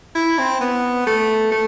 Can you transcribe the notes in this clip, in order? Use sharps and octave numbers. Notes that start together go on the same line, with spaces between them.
E4
C4
B3
A3
A3